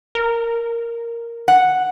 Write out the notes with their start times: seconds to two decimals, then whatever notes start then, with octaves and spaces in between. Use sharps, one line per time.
0.15 A#4
1.48 F#5